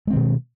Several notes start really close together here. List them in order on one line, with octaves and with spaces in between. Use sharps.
G#3 C4 D#3 B2